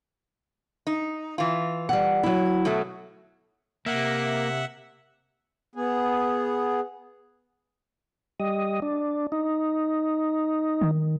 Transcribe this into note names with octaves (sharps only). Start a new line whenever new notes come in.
D#4
E3 F4
G3 F#5
F#3 E4
B2 F#3 A3
C3 A#3 E5 F#5
B3 G#4
G3 D#5
D4
D#4
D#3